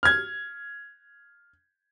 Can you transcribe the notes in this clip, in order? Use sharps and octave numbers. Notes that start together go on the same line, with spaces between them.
F6 G#6